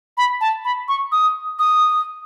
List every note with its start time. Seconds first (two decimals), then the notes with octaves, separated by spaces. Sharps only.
0.17 B5
0.41 A5
0.64 B5
0.88 C#6
1.12 D#6
1.59 D#6